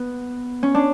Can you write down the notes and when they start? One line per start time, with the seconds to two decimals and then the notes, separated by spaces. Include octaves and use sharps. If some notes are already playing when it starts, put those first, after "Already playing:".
Already playing: B3
0.63 C#4
0.75 D4